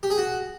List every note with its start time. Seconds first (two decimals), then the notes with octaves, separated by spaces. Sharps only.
0.03 G4
0.10 G#4
0.18 F#4